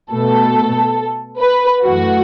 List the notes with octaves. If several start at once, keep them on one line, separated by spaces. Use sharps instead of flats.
B2 A3 A4
B4
F#2 E3 A3 F#4